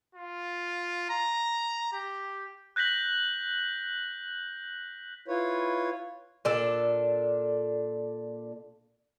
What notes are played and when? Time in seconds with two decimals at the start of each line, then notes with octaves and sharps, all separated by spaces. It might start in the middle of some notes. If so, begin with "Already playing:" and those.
0.15 F4
1.09 A#5
1.93 G4
2.76 F#6 G6 A#6 B6 F#7
5.28 E4 F4 B4 C#5
6.45 A#2 D4 A4